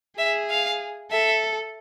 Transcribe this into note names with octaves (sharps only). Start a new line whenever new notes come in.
G#4 E5
F5
A4 E5